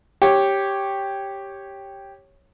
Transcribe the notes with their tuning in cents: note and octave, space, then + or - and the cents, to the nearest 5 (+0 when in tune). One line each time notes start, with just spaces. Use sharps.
G4 +0 C#5 -10